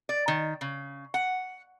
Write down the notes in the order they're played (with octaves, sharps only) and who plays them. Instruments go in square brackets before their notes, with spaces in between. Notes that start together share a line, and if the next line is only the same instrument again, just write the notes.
[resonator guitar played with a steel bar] D5
D#3
C#3
F#5